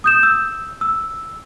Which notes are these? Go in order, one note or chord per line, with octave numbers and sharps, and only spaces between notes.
D#6 G6 E7
E6
E6